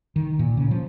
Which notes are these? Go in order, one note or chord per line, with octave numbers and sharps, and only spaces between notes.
D#3
A#2
C#3
F3